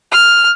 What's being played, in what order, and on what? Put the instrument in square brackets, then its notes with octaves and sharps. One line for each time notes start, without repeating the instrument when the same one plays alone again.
[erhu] F6